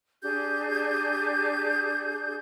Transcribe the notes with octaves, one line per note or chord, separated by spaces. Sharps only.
D4 G4 G#4 G6